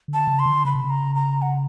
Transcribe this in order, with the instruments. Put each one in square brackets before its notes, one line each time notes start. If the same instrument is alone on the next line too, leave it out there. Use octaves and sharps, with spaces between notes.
[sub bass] D3
[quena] A5
[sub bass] C#3
[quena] C6
[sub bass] D3
[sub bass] C#3 [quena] B5
[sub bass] C3
C#3
[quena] A#5
A#5
F#5